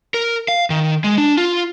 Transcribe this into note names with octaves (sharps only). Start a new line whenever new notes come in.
A#4
F5
D#3
G#3
D4
F4